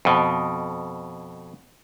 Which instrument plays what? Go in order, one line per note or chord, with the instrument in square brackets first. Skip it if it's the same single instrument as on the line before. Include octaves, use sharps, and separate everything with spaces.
[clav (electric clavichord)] F2 B2